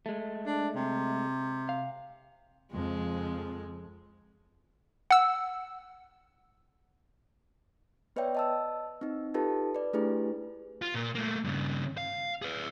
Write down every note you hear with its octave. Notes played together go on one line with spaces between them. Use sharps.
G#3 A3
D4
C3
F5
F2 C#3 F3 G#3
F#5 E6
B3 B4 C#5 D5 E5 G5
D#5 A5 E6
C4 D#4
D#4 F4 G4 A4 B4 A5
B4 D5
A3 D4 E4 G4 G#4 B4
F4
A#2 A#4
A3 A#3
G2 C#3
F5
G#4 B4